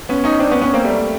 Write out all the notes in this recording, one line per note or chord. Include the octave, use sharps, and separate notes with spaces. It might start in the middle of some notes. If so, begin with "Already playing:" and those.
B3 C#4
C#4 D#4
C4 D4
B3 C#4
B3 C#4
A#3 C4
G3 A3